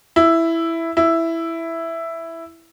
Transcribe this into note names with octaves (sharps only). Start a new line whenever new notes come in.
E4
E4